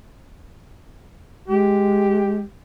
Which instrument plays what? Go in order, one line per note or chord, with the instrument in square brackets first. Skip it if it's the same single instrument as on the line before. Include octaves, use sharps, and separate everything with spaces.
[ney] G#3 [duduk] G4